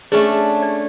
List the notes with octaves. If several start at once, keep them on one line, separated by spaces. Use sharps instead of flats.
A3 C#4 D4 G#4
D5